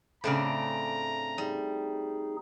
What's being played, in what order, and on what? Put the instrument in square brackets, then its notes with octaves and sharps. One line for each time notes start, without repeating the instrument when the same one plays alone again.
[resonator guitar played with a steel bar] A2 C#3 [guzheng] A3 C4 D4 [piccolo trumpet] A#5
[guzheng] G3 [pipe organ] D#4 G#4